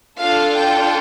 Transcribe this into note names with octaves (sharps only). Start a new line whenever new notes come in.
D4 F4 A4 F5
G5